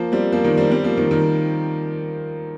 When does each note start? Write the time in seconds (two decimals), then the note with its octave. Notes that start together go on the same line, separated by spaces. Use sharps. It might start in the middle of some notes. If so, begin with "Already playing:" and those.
Already playing: F3 A#3
0.12 G3 C4
0.32 F3 A#3
0.44 D#3 G3
0.58 G3 C4
0.71 G3 C4
0.84 F3 A#3
0.97 D#3 G3
1.11 D#3